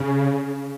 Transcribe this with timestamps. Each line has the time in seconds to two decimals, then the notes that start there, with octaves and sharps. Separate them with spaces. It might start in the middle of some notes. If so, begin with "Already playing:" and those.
Already playing: C#3